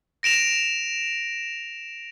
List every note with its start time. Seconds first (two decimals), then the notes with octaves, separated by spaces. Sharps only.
0.23 A#6 D7 E7 F7